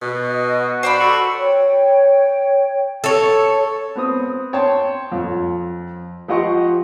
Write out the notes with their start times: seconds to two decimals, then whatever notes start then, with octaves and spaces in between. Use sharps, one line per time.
0.02 B2
0.30 D#5
0.59 F#4
0.83 C5 D5 B5
1.00 F#4 A4
1.39 C#5 G5
3.04 A4 C#5
3.96 B3 C4 D#6
4.53 C#5 G5 A5 C6
5.12 F2
6.28 F3 G4 D#5 F#5 C6 C#6